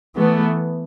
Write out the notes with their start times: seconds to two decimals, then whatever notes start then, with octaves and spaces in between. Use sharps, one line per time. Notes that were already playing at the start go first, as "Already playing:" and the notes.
0.16 E3 A3 B3